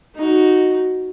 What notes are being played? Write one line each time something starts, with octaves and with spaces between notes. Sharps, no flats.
D#4 F#4